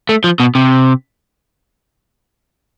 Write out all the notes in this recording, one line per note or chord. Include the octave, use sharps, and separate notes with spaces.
A3
F3
B2
C3